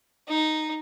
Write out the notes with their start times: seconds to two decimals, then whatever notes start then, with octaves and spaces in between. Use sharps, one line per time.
0.28 D#4